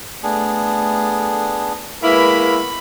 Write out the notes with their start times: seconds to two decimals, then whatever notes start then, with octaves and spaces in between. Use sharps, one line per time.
0.23 A3 B3 D4 G#4
2.03 G#3 A#3 B3 E4 B4 B5 C#6